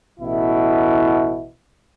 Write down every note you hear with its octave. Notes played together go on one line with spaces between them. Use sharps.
A1 B2 E4